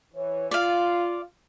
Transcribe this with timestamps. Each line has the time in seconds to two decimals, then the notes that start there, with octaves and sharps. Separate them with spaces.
0.14 E3 C#5
0.51 F4 D5 F5